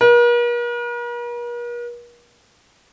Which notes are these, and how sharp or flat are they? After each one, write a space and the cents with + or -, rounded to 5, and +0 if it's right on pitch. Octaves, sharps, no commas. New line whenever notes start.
A#4 +45